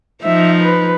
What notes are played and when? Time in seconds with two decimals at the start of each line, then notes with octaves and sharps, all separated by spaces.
0.23 F3 D#4 E5
0.60 B4